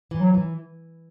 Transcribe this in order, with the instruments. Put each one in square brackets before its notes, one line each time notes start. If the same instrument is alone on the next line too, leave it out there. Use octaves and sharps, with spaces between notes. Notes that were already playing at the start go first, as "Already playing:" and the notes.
[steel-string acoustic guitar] E3
[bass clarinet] F#3
[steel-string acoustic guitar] E3